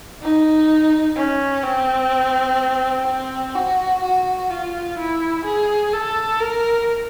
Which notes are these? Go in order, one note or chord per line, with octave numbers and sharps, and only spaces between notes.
D#4
C#4
C4
C4
F#4
F#4
F4
E4
G#4
A4
A#4